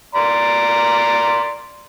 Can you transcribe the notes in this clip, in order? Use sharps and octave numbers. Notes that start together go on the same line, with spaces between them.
D5 A#5 C6